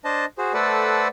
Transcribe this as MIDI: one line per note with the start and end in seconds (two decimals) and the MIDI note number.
0.05 0.25 62
0.05 0.25 72
0.05 0.25 75
0.05 0.25 81
0.38 0.53 66
0.38 0.53 68
0.38 0.53 72
0.54 1.08 57
0.54 1.08 69
0.54 1.08 71
0.54 1.08 72
0.54 1.08 74
0.54 1.08 78